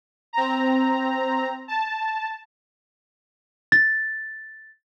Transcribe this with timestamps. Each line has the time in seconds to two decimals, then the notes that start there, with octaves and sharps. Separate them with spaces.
0.33 C4 A#5
1.68 A5
3.72 A6